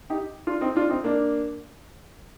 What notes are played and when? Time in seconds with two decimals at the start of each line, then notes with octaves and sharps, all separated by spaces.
0.10 D#4 G4
0.47 D4 F4
0.61 C4 D#4
0.76 D4 F4
0.90 C4 D#4
1.04 A#3 D4